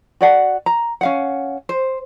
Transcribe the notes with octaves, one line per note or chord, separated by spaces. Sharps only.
F#4 D5 F#5
A#5
C#4 F5 F#5
C5